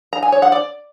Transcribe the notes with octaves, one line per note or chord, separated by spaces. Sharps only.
A#5
G#5
C#5
F#5
D5